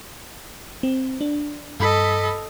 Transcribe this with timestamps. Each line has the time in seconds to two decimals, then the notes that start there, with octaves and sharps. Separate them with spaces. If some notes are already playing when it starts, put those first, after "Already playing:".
0.83 C4
1.21 D4
1.80 G2 A4 D#5 B5 B6